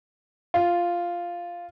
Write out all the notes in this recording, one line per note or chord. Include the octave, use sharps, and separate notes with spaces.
F4